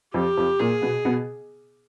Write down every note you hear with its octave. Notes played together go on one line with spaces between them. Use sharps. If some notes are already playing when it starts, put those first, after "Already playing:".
F2 F3 G4
F2 F3
A#2 A#3 G#4
B2 B3
B2 B3